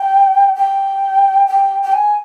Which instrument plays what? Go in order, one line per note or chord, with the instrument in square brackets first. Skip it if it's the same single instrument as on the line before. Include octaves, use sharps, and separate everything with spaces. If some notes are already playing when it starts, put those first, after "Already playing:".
Already playing: [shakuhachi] G5
G5
G5
G5
G#5